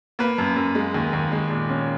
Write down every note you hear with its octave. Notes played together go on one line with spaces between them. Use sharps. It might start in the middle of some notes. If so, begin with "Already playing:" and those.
A#3 B4
F#2
F#2
G#3
D#2
D#2
G#3
A#2
C#4